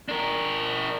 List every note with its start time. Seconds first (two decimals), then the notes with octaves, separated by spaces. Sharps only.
0.09 D4 A#4